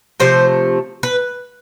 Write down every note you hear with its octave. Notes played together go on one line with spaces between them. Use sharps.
C3 F3 A3 C5
B4